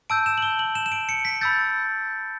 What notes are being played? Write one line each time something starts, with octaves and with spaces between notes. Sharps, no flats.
A5 E6 G6 D7
E7
F#7
G7
F#7
E7
E7
D7
C#7
B6
B5 E6 G6 A6